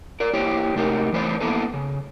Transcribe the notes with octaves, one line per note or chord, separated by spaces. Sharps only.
A#4 D5
A#3 E4 G4 C5 C#5
C3 A3 D#4 G4 A#4
E3 A3 B4 C5 D5
A#3 B3 E4 A4 B4
C#3